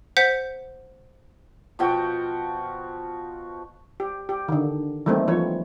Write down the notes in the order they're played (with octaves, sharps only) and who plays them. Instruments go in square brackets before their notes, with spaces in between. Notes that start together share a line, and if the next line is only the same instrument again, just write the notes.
[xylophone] C5 F#5 G6 B6
[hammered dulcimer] B2 F3 F#4 G5
[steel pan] G4
G4
D3 D#3
E3 G3 A3 A#3 C4 D#4
E3 F3 C#5